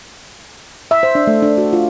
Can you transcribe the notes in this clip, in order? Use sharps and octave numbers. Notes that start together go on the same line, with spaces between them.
E5
C5
D4
A3
D4
F#4
F4